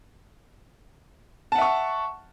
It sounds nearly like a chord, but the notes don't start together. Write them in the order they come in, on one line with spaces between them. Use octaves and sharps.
A5 F#5 E5 C#6